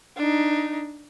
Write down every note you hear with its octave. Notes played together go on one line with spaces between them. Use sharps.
D4 D#4